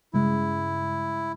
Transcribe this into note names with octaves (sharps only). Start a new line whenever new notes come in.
G2 C#3 G#3 E4